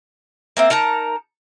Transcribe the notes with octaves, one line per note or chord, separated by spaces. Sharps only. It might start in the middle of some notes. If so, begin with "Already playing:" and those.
A#3 C4 E5
D#4 A#4 A5 A#5